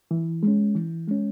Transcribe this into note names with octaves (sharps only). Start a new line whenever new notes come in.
E3
G#3 C#4
E3
G#3 C#4